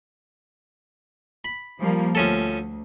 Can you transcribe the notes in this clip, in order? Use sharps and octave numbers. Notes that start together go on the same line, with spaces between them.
B5
F3 G3 A#3
D2 F3 C#4 A4